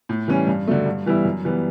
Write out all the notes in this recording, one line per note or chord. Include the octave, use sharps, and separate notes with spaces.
A2
E3 G3 C#4
G2
D3 F#3 A3
G2
E3 G3 B3 E4
F#2
E3 G3 B3